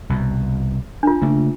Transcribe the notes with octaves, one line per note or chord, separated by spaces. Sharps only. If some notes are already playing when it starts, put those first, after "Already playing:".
C2 B2
D4 F4
C#3 A3 A#3